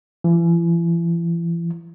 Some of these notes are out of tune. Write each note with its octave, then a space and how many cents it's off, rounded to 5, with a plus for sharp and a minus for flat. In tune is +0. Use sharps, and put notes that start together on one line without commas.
E3 +40